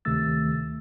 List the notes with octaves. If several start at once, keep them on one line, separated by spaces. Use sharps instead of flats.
D2 C3 D#3 A3 E6 A6